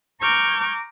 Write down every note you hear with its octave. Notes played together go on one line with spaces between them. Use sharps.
A#5 C#6 D6 F6 G6 G#6